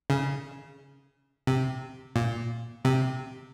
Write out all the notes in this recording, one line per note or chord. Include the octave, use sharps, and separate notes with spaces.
C#3
C3
A#2
C3